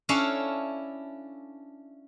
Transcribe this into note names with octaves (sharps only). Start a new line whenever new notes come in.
C#4 D4 E4 A4 C#5 F5